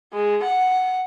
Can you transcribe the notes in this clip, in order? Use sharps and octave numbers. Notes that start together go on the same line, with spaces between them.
G#3
F#5